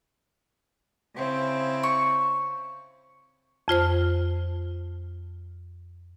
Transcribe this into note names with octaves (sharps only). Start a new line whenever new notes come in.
C#3 C4 E4
C#6
F2 F4 C5 F6